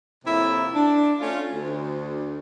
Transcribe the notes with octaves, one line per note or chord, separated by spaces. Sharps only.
F2 A2 C3 A#3 E4
D4
A3 C#4 F4
D2